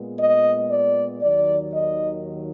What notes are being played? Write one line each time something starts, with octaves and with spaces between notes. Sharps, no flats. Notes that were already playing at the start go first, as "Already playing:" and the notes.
Already playing: A#2 G#3 B3
D#5
D5
D#2 D#3 F#3 D5
D#5